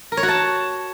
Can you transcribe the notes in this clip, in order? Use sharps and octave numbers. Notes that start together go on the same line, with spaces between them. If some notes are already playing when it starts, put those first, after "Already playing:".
A#4
C#5
F#4
A5